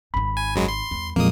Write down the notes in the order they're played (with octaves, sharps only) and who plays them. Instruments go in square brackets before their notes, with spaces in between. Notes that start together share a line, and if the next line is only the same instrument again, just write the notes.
[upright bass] G#1 D#4 [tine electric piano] B5
[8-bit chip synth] G#5
F#2 F#3 G#3
C6
[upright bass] E2 G3
[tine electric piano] F2 A#2 G#3 [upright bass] F3 F#3 [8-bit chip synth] A#3 D#6